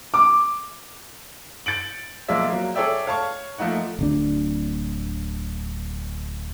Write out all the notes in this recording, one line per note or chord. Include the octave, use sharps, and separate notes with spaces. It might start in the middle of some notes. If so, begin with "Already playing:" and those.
D6
G6 A6 C#7 D7 F#7
B1 F3 G#3 A#3 D5 E5
F#3 A#3
G#4 A4 C#5 D5 E5 G5
C#5 F5 A5 C#6
F3 A3 A#3 D#4 F#5
D1 D2 D4